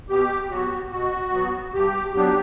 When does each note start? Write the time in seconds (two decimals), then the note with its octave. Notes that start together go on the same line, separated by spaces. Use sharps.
0.09 B2 G4
0.50 F#3 B3 F#4
0.91 B2 F#4
1.32 F#3 B3
1.73 G2 G4
2.14 F#3 B3 D4 G4